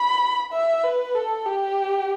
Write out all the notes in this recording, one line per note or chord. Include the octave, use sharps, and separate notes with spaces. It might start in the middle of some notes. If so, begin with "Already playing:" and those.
Already playing: B5
E5
B4
A4
G4